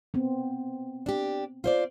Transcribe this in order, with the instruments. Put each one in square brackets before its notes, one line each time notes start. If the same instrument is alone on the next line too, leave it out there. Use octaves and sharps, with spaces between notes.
[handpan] B3 C4
[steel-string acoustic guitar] D4 G4
F4 C5 D5